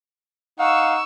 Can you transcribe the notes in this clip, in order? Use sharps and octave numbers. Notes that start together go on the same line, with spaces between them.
D#4 F5 F#5 C#6 E6